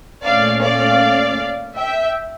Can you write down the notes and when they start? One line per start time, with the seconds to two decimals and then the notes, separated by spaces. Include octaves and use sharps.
0.24 A#2 A3 C#4 D5 F5
0.61 D5 F5
1.77 E5 G5